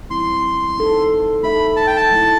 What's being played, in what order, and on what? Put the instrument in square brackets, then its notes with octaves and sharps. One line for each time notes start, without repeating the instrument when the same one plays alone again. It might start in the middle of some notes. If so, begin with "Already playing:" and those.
[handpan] E3 G3 C4 E4 [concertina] C6
[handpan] A3 D#4 A4
[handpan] A3 D#4 A4 E5 [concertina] B5
[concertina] A5
G5
A5
[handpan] B2 F#3 A3 E4